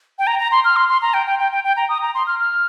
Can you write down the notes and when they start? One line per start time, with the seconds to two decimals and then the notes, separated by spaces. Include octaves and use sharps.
0.19 G5
0.27 A#5
0.39 A#5
0.51 C6
0.65 F6
0.76 C6
0.89 C6
1.02 A#5
1.14 G5
1.27 G5
1.39 G5
1.52 G5
1.64 G5
1.77 A#5
1.89 D#6
2.02 A#5
2.15 C6
2.27 F6
2.40 F6